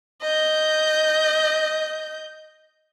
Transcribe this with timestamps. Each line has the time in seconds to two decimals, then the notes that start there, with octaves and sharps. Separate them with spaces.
0.21 D#5 G6